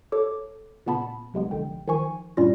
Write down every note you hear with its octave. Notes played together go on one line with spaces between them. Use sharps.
A4 C#5 D6
A#2 C#3 B3 A5 B5
B1 C3 G#3 B3
A#1 D3 G5
D#3 F3 G#5 C#6
G2 A#2 G3 C#4 F4 A#6